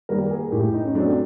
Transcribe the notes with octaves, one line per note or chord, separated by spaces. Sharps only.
D#3 G3 A#3 A#4
G#4
A2 G4
D#4
C#4
F#3 A3 C4 D4